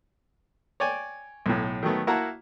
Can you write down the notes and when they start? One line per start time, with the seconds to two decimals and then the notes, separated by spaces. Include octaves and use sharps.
0.80 C#5 D5 G5 G#5
1.46 B1 A2
1.83 D#3 F#3 A3 B3
2.07 A#3 E4 F#4 F#5 A5 A#5